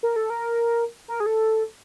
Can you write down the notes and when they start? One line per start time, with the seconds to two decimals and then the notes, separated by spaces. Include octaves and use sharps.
0.03 A#4
0.16 A4
0.30 A#4
1.08 A#4
1.20 G#4
1.26 A4